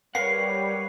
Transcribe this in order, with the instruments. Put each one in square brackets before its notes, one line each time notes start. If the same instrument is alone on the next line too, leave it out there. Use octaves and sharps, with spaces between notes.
[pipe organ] G3 [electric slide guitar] A#4 F5 F#5 [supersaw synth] B4 C#5 [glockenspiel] C7